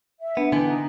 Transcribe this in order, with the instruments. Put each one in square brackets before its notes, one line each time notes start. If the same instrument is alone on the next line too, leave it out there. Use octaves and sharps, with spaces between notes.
[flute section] E5
[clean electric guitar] B3 [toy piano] D4
[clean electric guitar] D3 E3 B3 [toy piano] D#5 G#5 [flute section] G5
[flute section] D#4